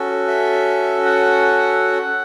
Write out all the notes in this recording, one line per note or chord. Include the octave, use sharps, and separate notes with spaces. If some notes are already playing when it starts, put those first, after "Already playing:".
Already playing: C#4 F#4 A4
E5
F#5